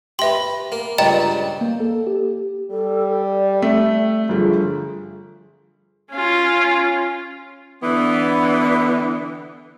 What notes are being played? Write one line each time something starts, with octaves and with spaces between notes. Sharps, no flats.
G4 B4 E5 C6
A#3
C#2 G2 G3 D#5 G5 A#5
A#3
A4
G4
G3 A4
D5
A3 E5
G1 F3 G#4
C#4 F4
D3 E3 B3